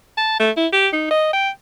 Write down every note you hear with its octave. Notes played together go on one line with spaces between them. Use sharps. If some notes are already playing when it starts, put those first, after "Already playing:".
A5
A3
E4
G4
D#4
D#5
G5